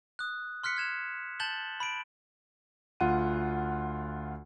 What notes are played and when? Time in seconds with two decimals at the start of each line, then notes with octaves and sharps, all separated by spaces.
0.19 D#6 F#6
0.63 C6 F6 F#6 B6 C#7
0.77 F6 G#6 E7 F7
1.40 A5 G6 A6 E7 F#7 G7
1.80 B5 D7
3.00 D2 F4 F#5 D#7